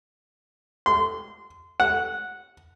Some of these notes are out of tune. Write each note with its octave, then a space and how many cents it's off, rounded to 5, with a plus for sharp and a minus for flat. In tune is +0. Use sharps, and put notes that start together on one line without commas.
C6 -25
F#5 -10